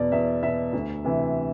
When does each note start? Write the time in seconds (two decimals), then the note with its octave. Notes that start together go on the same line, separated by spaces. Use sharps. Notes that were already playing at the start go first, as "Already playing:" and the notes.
Already playing: E2 B2 D5
0.12 E2 E5
0.42 B2 E5
0.73 D2
1.05 C3 E3